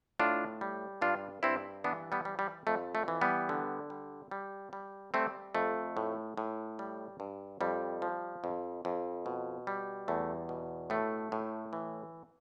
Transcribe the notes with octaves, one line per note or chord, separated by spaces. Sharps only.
A2 D4 F4
G3
G2 D4 F4
G2 C4 E4
E3 B3 D4
G3 B3
G3
G3
F2 A3
A3
E3
G3 B3
D3
G3
G3
G3
G3 A3 C4
F2 A3
A2
A2
G3
G2
F2 G3
F3
F2
F2
B2
G3
E2 A3
B2
A2 A3
A2
E3